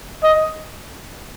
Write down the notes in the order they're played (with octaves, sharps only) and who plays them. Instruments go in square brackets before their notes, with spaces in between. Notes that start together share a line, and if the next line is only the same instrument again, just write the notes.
[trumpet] D#5